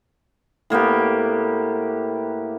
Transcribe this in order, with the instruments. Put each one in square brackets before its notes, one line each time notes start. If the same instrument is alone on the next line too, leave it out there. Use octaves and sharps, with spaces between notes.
[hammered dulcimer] A2 A#3 B3 G4